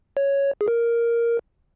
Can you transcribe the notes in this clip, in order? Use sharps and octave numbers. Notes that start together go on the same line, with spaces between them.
C#5
G#4
A#4